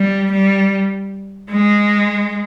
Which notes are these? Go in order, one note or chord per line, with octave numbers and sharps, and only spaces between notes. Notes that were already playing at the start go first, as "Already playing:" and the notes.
Already playing: G3
G3
G#3